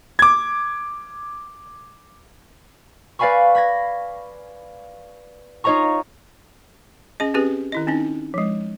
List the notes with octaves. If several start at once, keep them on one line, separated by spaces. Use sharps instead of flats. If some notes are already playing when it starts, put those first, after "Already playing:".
D6 G#6
B4 D5 F5 G#5 B5 C#6
B5 G#6 A#6
D#4 F4 C#5 D#5 A#5 C#6
C#4 G#4 D#5
C4 C#4 G4 G#4 B4
D#3 E4 D#5
C4 C#4 D#4
F3 G#3